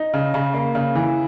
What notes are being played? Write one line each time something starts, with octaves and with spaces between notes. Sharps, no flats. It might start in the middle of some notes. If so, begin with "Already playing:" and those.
Already playing: D#4
C#3
C#3
A#3
C#3
E3